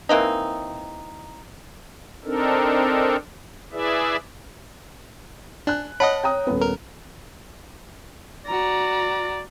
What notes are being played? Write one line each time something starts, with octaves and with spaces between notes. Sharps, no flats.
E3 A#3 C4 D#4
C4 D4 D#4 A4 A#4
E4 G#4 B4 D5 E5
D4 G#5 F#6
C#5 D#5 F#5 A5 B5
G5 A#5 D#6
D#1 B3
A#4
F#4 D5 A#5